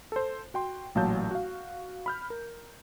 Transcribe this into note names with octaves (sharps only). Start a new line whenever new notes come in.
A4 C5
F#4 G5 C6
A1 A#2 F#3 F5 A5 G6
F#4 F5
B5 F6 G6
A#4